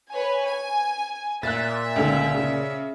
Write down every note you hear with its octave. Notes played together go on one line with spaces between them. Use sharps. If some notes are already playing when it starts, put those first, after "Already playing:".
B4 C#5 G#5
G#5
A#2 E5 F#6 A6
C#2 D3
C#3